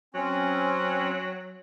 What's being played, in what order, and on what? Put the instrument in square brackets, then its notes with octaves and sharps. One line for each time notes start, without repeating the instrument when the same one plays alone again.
[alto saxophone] F#3 [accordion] C4 C#4